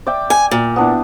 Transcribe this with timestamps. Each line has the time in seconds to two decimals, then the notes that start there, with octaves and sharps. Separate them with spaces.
0.07 D5 E5 G5
0.30 G#5
0.51 A#2
0.76 B3 D4 E4